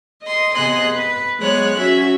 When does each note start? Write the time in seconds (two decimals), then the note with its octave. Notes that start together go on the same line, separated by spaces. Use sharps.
0.22 D#5 C6
0.54 C3 B3 G#4 D#5 C6 F#6
0.91 B4
1.38 F#3 G#3 B3 C#5 F#6
1.78 C#4 F#4 E5